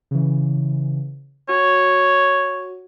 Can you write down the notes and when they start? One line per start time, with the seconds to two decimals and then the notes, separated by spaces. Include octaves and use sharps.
0.11 C#3 E3
1.49 F#4 C#5